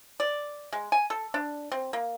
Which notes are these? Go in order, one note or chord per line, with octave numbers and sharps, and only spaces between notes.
D5
G#3
G#5
A4
D4
C4
A#3